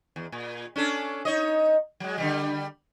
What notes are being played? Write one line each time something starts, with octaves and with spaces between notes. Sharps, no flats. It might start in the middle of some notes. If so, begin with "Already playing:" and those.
E2
A#2
C#4 D4 A4
D#4 C#5 D#5
F#3 G#3
D3 F3 G3